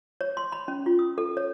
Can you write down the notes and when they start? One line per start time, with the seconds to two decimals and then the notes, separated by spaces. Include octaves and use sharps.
0.21 C#5
0.37 C6
0.52 B5
0.68 C#4
0.86 F4
0.99 D#6
1.18 A4
1.37 C#5